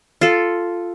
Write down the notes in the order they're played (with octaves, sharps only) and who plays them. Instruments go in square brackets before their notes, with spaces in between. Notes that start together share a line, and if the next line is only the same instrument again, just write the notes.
[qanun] F4 A4